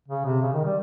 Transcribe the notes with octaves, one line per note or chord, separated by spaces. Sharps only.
C#3
C3
C#3
D#3
G3